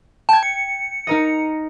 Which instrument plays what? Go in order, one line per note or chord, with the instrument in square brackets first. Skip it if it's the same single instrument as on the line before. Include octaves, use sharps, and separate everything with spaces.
[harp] G5 G#6 [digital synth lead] A5
[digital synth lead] C#7
[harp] D#4 A#4 D#5